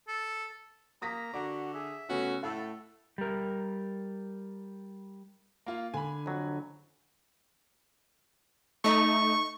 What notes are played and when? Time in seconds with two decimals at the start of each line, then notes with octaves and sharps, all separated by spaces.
0.08 A4
1.02 A#3 A#5 D#6 A#6 B6
1.34 D3 F#4 D5 D6
1.74 G#4 E5
2.09 C#3 A3 B3 C#4 F#4
2.43 A2 A3 A4 F#5 E6
3.18 G3 A#4
5.66 A#3 F4
5.94 D3 G#5 B5
6.26 F2 F#3
8.84 A3 D#4 C#6